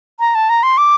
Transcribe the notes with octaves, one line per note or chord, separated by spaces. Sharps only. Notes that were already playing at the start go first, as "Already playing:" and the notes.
A#5
A5
A#5
C6
D6